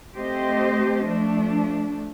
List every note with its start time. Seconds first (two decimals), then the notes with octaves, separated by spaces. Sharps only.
0.16 A3 C4 G4 C5 D#5
1.06 F3 A3 D4